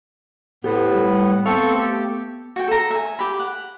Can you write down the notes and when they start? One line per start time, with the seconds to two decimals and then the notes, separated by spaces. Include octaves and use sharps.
0.64 A2 B3 G4 A4 C5
0.95 G3
1.46 A3 B3 C4 A4 F5 C#6
1.78 G4
2.56 F#4 G5
2.68 A4 A#5
2.90 E5 G#5
3.19 G4 B5
3.39 F#5